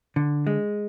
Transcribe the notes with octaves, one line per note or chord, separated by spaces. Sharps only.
D3
G#3